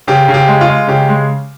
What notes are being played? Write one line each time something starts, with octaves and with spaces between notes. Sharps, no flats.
C#3 G4
C#3
G4
G#3
F4
G#3
C#3 G4
G#3